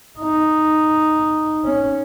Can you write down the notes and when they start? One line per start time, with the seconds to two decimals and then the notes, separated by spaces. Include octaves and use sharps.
0.19 D#4
1.65 C#4